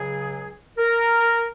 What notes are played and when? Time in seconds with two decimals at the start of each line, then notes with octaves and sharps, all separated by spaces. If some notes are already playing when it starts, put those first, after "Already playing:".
Already playing: C#2 C#3 F#3 G#4
0.78 A#4